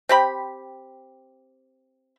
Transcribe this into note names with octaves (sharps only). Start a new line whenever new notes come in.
C4 G4 B5